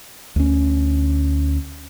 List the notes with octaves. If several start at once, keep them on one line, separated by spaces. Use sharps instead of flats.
D2 C#4